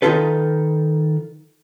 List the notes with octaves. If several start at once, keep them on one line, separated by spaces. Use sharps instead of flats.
D#3 F#3 D#4 F4 A4 B4